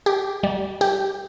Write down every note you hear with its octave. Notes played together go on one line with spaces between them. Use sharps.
G4
G3
G4